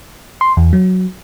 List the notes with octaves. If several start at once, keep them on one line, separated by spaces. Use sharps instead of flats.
C6
E2
F#3